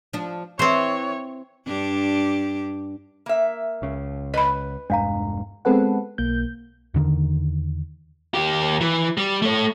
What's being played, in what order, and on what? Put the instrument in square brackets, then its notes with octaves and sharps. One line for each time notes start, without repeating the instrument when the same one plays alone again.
[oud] F3 D4
[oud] E3 [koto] C4 C5 [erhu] C#5
[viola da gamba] G2 D4 G4
[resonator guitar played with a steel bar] A#3 E5
[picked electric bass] C#2 C#3
[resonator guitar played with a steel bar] B4 [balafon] D#5 B5
[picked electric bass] E1 G2 G#3 [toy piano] D4 F5 A#5
[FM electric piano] G#3 B3 C4 A4 B4 F#5
B1 A#3 G6
[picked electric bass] E2 D3 D#3
[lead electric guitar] D#2 G4
E3
G3
A3 C#5